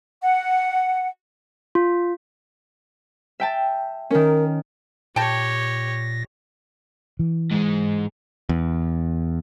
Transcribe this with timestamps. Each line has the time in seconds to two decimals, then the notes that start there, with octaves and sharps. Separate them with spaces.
0.21 F#5
1.75 F4
3.40 E5 G5 A5
4.11 D#3 C#4 A#4
5.16 A#2 G4 C#5 G5 A5 A#6
7.19 E3
7.51 G#2 G#3
8.49 E2